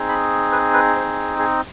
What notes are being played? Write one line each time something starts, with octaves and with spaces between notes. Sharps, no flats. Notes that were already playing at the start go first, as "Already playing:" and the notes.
Already playing: C4 D#4 G#4
B5
B4
B4
C5
G#4